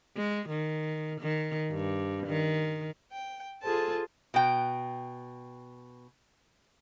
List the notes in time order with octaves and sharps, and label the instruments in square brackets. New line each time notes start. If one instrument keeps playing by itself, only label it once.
[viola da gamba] G#3
D#3
D#3
G2
D#3
[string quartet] G5
F4 G#4 A4 C5 A5
[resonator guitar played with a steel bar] B2 G5